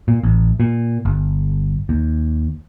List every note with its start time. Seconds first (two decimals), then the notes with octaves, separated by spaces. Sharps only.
0.08 A#2
0.23 A1
0.60 A#2
1.05 G1
1.89 D#2